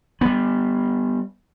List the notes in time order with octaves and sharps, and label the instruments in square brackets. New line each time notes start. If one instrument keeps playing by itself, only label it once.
[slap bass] G3 B3